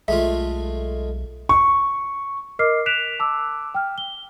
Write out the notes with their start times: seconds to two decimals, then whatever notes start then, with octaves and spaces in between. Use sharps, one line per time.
0.08 B1 G#3 A3 F4 E5
1.49 C#6
2.59 A#4 D#5 D6 F6 C7
2.86 F#6 B6 D7 E7 F7
3.20 A5 D6 E6
3.75 G5 F6
3.98 G7